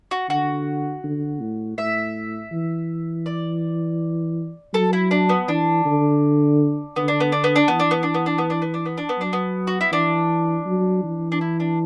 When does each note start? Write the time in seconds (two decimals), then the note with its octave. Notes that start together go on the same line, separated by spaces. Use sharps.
0.11 F#4
0.29 D3 F#4
1.04 D3
1.40 A2
1.78 A2 E5
2.52 E3
3.26 D5
4.74 F#3 A4
4.93 E4
5.11 D4
5.29 B3
5.48 E3 D4
5.85 D3
6.96 D3 B3
7.08 D4
7.20 B3
7.32 D4
7.44 B3
7.56 D4
7.68 E3 B3
7.80 D4
7.91 B3
8.03 D4
8.14 B3
8.26 D4
8.38 B3
8.50 D4
8.62 B3
8.74 D4
8.86 B3
8.97 D4
9.09 B3
9.18 F#3 D4
9.33 B3
9.67 F#4
9.81 E4
9.92 E3 D4
10.66 F#3
11.04 E3
11.32 D4
11.41 E4
11.60 D4